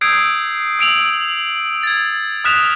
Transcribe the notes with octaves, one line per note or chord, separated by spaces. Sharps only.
D#6 E6 G6 G#6 C7 D7
E6 D7 F7 F#7
G#6 A6
D#6 F6 F#6 B6 E7 F7